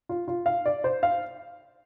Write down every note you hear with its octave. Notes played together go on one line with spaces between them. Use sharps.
F4
F4
F5
D5
C5
F5